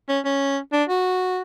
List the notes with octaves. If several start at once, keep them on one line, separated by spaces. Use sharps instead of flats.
C#4
C#4
D4
F#4